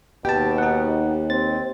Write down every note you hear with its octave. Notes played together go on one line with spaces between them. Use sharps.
D#2 B2 G4 G5 A5
D#4 F#5
C4 A6